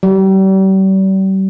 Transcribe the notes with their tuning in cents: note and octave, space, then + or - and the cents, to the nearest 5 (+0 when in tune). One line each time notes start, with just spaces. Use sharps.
G3 -40